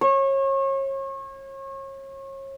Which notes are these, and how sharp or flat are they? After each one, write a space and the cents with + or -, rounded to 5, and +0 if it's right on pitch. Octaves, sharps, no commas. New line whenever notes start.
C#5 -35